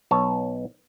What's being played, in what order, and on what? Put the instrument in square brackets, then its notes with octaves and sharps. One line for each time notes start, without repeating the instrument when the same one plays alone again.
[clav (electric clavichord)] B1 C#5 A5